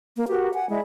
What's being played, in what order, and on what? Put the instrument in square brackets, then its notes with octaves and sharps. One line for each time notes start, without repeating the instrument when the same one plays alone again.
[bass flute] A#3
[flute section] F#4 A#4 B4 [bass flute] G4
[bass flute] F#5 [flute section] G#5
[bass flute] G#3 [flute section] E4 D5 B5